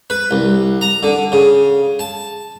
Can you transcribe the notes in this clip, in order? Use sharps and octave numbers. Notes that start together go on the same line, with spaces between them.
B4
C2
A#5
D3
C#3
A5